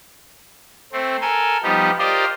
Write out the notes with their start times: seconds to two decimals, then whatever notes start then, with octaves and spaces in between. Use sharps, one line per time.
0.93 A3 C4
1.21 A4 A#4 G#5
1.63 F3 G3 B3 D#4 G4
1.99 F4 G4 A#4 C5 D5 D#5